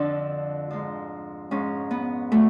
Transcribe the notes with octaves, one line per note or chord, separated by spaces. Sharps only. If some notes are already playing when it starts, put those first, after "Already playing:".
Already playing: F2 D3 F3 D4
G#2 F3
G#2 F3 C#4
B3
D3 F#3 A3